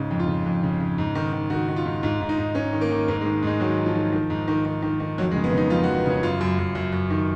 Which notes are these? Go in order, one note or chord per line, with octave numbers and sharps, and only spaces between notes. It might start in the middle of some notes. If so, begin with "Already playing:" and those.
Already playing: G#2 C#3
F2
F4
C#3
F2
C#3
C#3
G#2
D#3
D#3
D#3 F#4
D#3
F4
G#2
G#2 F4
G#2
D#4
G#2
G#2 C#4
D#3
A#3
D#3
G#2 A#3
G#3
D#3
G#2 G#3
D#3 F#3
D#3
F3
D#3
D#3
G#2
D#3
D#3
D#3
D#3
F2 F#3
G#3
C#3
B3
C#3
D#4
F2 F4
F#4
F2
B3
C#3 C#4
F#2 F4
F#2
F#2
F#2
F#2
D#3